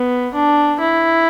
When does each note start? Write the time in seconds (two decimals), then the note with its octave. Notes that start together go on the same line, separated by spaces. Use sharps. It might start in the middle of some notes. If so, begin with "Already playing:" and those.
Already playing: B3
0.34 D4
0.80 E4